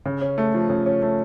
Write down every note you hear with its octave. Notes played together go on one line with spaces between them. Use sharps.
C#3
C#4
A3
F3
C#3
C#4
A3